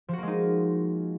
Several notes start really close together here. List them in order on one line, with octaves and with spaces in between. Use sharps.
F3 F#4 A#3 G#3 D#4